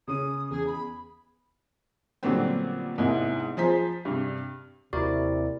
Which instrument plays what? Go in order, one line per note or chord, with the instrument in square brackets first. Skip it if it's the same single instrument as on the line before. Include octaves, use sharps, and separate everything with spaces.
[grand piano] C#3 C#4 D#7 [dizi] D#6
[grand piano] E2 [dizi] G#4
[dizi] B5
[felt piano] A#2 D3 F#3 G3 B3 C4
E2 G#2 C3 A#3 E4
F3 G#4 C5 A#5 B6
G2 C3
[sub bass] D#2 [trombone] C3 [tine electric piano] E4 A#4 D5 [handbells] F#4